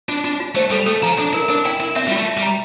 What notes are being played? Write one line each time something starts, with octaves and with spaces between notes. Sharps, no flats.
D4 F4
D4 F4
F4
A3 C5
G3 A4
A3 A4
F3 A#5
D4 A4
E4 A#4
D4 A#4
E4 G5
E4 A#4
C4 E5
G3
F4
A3
E5
G3
A#5